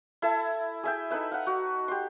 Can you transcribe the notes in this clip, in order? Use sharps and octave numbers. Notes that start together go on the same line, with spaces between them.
E4 A4 E5 A5
G#4 E5 G5
D#4 A4 B4 E5
F5 F#5
F#4
G4 C6